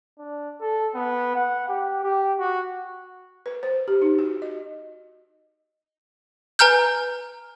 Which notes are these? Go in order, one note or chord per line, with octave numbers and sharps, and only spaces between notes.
D4
A4
B3
F#5
G4
G4
F#4
B4
C5
G4
D#4
F#4
D#5
B4 G#5 A#5 F6 G6